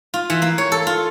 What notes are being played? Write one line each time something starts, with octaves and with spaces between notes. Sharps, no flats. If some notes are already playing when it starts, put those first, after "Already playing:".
F4
E3
A#3
C#5
A4
F4